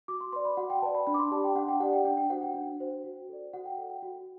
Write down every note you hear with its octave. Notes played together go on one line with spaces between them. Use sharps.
F#4 D6
C6
B4 D5 C6
B5
F#4 F#5
G5
B4 D5 A5
B5
D4 B5
D6
C6
G4 D5 A5
G5
D4 F#5
G5
G4 D5 F#5
G5
D4 G5
G5
F#4 C5 F#5
G5
D4
F#4 C5
F#4
A4 D5
F#4 F#5
G5
A4 D5 F#5
G5
F#4